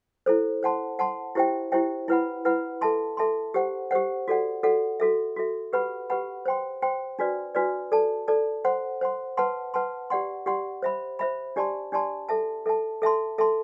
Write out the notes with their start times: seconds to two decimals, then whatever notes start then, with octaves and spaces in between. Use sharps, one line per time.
0.26 E4 A4 C5
0.63 C5 F#5 A5 C6
0.99 C5 F#5 A5 C6
1.35 E4 G4 C5 E5 G5
1.72 E4 G4 C5 E5 G5
2.08 E4 B4 F#5 B5
2.45 E4 B4 F#5 B5
2.81 A4 E5 A5 C6
3.17 A4 E5 A5 C6
3.54 G4 C5 F#5
3.91 G4 C5 F#5
4.28 F#4 A4 D5 F#5
4.63 F#4 A4 D5 F#5
5.00 F#4 A4 E5
5.36 F#4 A4 E5
5.73 G4 B4 F#5 B5
6.10 G4 B4 F#5 B5
6.46 C5 G5 C6
6.82 C5 G5 C6
7.19 D4 F#4 B4 D5
7.55 D4 F#4 B4 D5
7.92 A4 D5 A5
8.28 A4 D5 A5
8.65 C5 F#5 C6
9.01 C5 F#5 C6
9.37 B4 F#5 A5 C6
9.74 B4 F#5 A5 C6
10.10 G4 D5 F#5 C6
10.46 G4 D5 F#5 C6
10.82 C5 E5 B5
11.19 C5 E5 B5
11.56 D4 G4 D5 A5 C6
11.92 D4 G4 D5 A5 C6
12.29 A4 E5 A5
12.66 A4 E5 A5
13.02 A4 E5 A5 C6
13.38 A4 E5 A5 C6